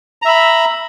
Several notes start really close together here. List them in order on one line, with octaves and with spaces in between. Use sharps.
A#5 E5 B5